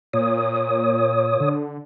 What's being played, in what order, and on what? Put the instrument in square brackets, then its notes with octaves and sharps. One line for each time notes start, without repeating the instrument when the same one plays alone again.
[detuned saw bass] A#2 [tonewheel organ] C#5 D#6
[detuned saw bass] D3